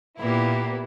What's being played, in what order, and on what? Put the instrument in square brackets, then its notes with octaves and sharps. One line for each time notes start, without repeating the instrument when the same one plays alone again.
[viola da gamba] A#2 A#3 G4 [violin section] B3 E4